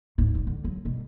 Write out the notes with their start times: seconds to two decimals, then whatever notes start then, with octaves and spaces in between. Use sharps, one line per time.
0.18 D1 G#2
0.35 D2
0.47 D3
0.65 F#3
0.85 G2 B2